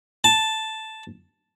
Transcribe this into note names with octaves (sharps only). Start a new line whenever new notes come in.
A5